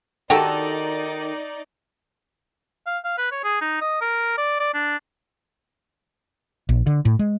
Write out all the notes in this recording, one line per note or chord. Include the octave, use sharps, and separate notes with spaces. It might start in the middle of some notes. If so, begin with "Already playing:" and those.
D#3 D#4 F#4 G4 A4 D5
F5
F5
B4
C#5
G#4
D#4
D#5
A#4
D5
D5
D4
A#1
D3
A2
G#3